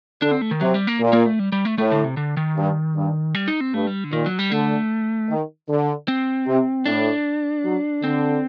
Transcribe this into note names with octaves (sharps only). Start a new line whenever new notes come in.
D3 D4
C4
A3
D#3
C3 F#3
G3
A#3
A#2
A#3
A3
G3
G3
A3
A2 A3
D3
C3
D3
D#3
G2
G2
G3
D#4
C4
G2 A3
G3
D3
A#2 D#3
F#3
G3
D3 A3
D#3
D3
C4
C3
A2 D4
F#3
D3 C4